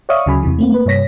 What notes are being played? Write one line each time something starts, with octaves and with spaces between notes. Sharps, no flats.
C#5 D5 E5 F5 C#6 D#6
D2 C#3 F#3 G#5 B5
E2 C3 E3
A3 A#3 C4
A#3 B4
G2 C3 C#5 A#6 B6